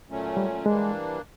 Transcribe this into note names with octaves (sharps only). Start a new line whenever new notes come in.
A#2 F#3 A3 C#4
G3
E3 G3 G#3 A#3 D4